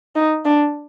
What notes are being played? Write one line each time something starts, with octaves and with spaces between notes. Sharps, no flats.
D#4
D4